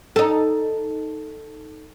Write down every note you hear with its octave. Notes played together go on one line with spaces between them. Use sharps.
D#4 A4